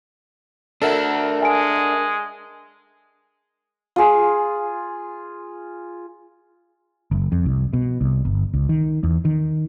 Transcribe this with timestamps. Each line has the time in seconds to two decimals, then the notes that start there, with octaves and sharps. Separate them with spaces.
0.82 D4 A4 A#4 E5 F#5
1.42 G#3 G#5 D7
3.96 F4 G#4
7.11 F#1
7.32 F2
7.46 C2
7.73 B2
8.01 C2
8.25 G1
8.54 C#2
8.69 D#3
9.03 E2
9.25 D#3